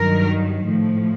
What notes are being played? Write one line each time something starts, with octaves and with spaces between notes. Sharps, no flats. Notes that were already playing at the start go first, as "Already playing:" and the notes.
Already playing: G2 D#3 F#3 A#4
A2 F3